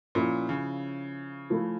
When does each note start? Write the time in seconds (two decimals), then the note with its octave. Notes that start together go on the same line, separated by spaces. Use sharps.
0.15 A#2 F3 C#4 E4
0.49 C#3
1.50 F3 A3 E4